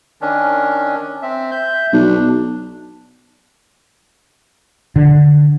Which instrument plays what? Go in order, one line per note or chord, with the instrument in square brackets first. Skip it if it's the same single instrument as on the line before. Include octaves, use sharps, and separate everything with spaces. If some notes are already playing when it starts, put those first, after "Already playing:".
[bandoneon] D#3 C#4 D4
C4 E5
E5 G6
[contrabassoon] B1 [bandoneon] D4
[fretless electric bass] D3